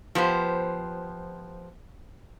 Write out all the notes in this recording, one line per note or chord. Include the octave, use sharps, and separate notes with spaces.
F3 B3 G4 C5